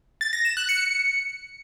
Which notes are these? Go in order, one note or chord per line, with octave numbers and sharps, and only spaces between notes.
A6
A#6
E7
F#6
C#7